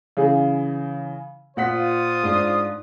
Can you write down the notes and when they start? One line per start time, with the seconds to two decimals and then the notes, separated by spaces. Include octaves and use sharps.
0.17 C#3 E3 G#4
1.57 A#2 F4 C5 F#5 D#6 B6
2.23 G#2 D4